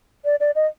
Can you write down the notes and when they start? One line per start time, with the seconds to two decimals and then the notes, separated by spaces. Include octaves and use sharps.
0.25 D5
0.40 D5
0.55 D#5